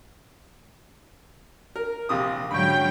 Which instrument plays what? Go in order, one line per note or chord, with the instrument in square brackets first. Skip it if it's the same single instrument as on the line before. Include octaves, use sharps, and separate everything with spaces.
[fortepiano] A#4
A#1 C3 D#6
[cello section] G#2 D3 F#3 [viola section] C#4 G5 [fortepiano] B5 C#6